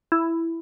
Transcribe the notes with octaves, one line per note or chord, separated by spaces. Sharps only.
E4